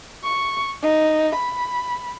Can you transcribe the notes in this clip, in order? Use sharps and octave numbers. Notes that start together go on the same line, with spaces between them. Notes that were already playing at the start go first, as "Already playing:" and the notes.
C#6
D#4
B5